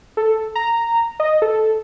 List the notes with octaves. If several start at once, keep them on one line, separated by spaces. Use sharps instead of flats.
A4
A#5
D#5
A4